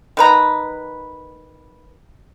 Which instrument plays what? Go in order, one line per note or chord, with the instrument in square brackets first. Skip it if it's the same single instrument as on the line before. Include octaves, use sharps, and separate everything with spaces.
[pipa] D#3 B4 A#5